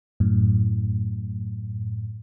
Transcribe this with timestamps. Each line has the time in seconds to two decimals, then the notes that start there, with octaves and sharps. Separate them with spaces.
0.20 F#2 A2